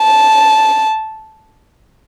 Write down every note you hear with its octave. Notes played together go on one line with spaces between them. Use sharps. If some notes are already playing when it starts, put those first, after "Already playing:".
Already playing: A5